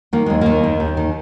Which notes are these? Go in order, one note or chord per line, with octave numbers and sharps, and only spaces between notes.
D#3 A#3
D#2 G#3
D#3 A#3
D#2
D#2
D#3